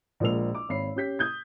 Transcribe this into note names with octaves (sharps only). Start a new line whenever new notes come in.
A#1 F3 G#3 A#4 E6 F7
D6
G#1 C#5 B5 C7
C#4 G4 G6 B6
D#6 G6 G#6